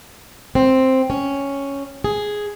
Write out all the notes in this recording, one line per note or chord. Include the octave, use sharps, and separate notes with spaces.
C4
C#4
G#4